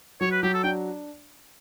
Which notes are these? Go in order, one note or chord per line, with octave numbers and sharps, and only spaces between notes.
F#3 C#5
B4
F#3 G4
A4
D4 G5